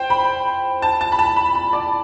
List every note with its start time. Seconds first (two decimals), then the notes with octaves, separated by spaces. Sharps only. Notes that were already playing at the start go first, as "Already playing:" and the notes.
Already playing: C5 G5
0.10 B5
0.82 A5
1.01 A5
1.12 B5
1.19 A5
1.36 B5
1.55 B5
1.73 D5